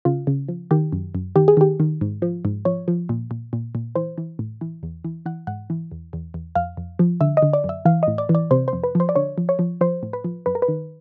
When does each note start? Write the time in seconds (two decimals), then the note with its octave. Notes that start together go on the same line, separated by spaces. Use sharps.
0.05 C#3 F4
0.27 C#3
0.48 F3
0.71 D#3 G4
0.92 F#2
1.15 F#2
1.36 D#3 G4
1.48 G#4
1.57 D#3 G4
1.80 D#3
2.01 G#2
2.22 F3
2.45 G#2
2.65 F3 C#5
2.88 F3
3.09 A#2
3.31 A#2
3.53 A#2
3.75 A#2
3.95 E3 C5
4.18 E3
4.39 A2
4.61 E3
4.83 E2
5.05 E3
5.26 E3 F#5
5.47 G#2 F#5
5.70 E3
5.91 E2
6.13 E2
6.34 E2
6.55 F2 F5
6.77 F2
6.99 F3
7.21 D3 E5
7.37 D#5
7.43 D3
7.53 D5
7.64 F#2
7.69 E5
7.85 E3 F5
8.03 A2 D#5
8.18 D5
8.29 E3
8.35 D5
8.51 C3 C5
8.68 C5
8.73 F2
8.84 B4
8.95 F3 C5
9.09 D5
9.16 D3 C#5
9.38 F3
9.49 C#5
9.59 F3
9.81 F3 C5
10.03 A2
10.13 B4
10.24 F3
10.46 F#2 B4
10.55 A#4
10.62 B4
10.68 D#3